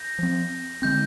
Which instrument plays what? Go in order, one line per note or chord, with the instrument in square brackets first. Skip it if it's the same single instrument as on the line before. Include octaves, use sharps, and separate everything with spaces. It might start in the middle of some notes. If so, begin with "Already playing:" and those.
Already playing: [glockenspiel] G6 A#6
[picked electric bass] F3 C4
[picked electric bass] D3 G#3 C4 [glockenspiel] G6